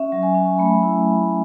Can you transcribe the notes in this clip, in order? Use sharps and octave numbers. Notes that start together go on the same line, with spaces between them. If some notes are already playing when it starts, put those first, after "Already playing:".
Already playing: C#4 E5
F#3
G#5
C#4
A3 B5
E4